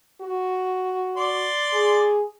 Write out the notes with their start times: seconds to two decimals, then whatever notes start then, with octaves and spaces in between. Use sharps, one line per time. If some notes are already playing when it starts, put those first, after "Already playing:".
0.21 F#4
1.17 D5 C6
1.73 G#4